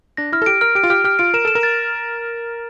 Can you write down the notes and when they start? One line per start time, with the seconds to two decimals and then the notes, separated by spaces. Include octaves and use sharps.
0.17 D4 A#6
0.32 E4 F6
0.42 A4
0.46 G4 D7
0.61 A#4 F6
0.75 G4 D7
0.83 F4
0.90 G4 F6
1.04 G4 F6
1.19 F4 D7
1.34 A#4 E7
1.45 A4 E7
1.55 A#4
1.63 A6